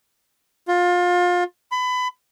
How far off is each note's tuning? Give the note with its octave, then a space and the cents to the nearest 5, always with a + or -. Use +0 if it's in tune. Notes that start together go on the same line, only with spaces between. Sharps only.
F4 +25
B5 +25